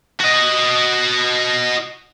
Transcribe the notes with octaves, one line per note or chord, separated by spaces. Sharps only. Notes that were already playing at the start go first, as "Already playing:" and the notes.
F#4 D#5